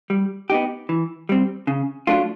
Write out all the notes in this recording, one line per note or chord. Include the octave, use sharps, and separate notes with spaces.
G3
B3 D#4 G4
E3
G3 C4
C#3
F#3 A3 D4 F4